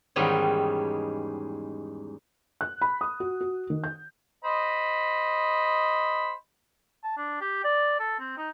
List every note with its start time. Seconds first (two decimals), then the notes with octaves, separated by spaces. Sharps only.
0.16 E2 G#2 D#3 G3 C#4 G#4
2.61 F#6
2.82 B5
3.01 D#6
3.20 F#4
3.41 F#4
3.70 D#3
3.84 G6
4.44 C5 D#5 B5
7.03 A5
7.17 D4
7.41 G4
7.64 D5
8.00 A4
8.19 C4
8.37 D#4